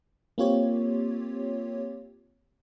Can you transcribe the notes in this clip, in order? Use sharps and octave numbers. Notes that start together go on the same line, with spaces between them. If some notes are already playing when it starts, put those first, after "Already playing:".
A#3 C4 F4 G4 C#5